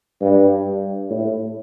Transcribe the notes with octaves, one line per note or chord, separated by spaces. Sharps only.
G2
A2